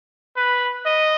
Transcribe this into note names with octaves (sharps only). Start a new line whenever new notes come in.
B4
D#5